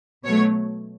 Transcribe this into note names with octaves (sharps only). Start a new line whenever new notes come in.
B2 F#3 A3 C#5